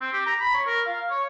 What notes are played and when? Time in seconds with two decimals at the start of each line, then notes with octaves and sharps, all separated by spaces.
0.01 C4
0.13 G4
0.26 A#5
0.40 B5
0.54 C#5
0.66 A#4
0.86 F5
1.10 C#5